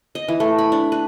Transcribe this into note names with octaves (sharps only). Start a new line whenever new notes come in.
D#5
E3
A3
B5
D4
B4